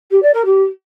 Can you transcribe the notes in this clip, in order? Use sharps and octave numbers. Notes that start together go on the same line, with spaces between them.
G4
D5
A#4
G4